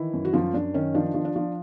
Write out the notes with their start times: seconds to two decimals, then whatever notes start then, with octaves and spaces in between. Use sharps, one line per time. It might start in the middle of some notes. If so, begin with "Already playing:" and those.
Already playing: D#3 E3 E4
0.13 F#2
0.25 F#4
0.33 F#2 F3 F4
0.54 F#2 D4
0.74 D#3 C#4
0.94 F3 D4
1.14 F3
1.25 D4
1.36 F3